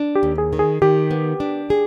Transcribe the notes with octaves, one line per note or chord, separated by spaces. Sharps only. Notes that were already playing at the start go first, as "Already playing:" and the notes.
Already playing: D4
G4
D#2
G#4
D#3
G#4
D#3 G4
B3
D4
G#4